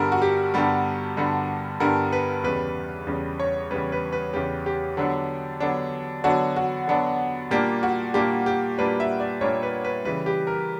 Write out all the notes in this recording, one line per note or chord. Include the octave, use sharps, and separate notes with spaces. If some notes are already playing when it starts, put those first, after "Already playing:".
Already playing: G2 D3 G3 B3 A#4
F#4
G4
G2 D3 G3 B3
G2 D3 G3 B3
G2 D3 G3 B3 A#4
B4
E2 C#3 G3 B4
E2 C#3 G3
C#5
E2 C#3 G3 B4
B4
B4
E2 C#3 G3 G4
G4
D3 F#3 B3 D4
D3 F#3 B3 D4
D3 F#3 B3 D4 F#4
F#4
D3 F#3 B3 D4
A#2 G3 A#3 D4 G4
F#4
A#2 G3 A#3 D4 G4
G4
A#2 G3 A#3 D4 B4
E5
D5
A#2 G3 A#3 D4 C#5
B4
B4
C#3 E3 G3 B4
G4
A#4